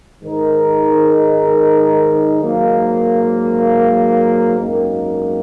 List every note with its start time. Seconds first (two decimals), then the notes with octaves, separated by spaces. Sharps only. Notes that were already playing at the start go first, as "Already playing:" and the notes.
0.22 G#2 D#3 G#3 D#4 A#4
2.41 G#2 F#3 A#3
4.59 G#1 F#2 D#3 A#3